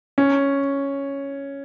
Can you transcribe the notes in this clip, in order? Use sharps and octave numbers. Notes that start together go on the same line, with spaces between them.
C#4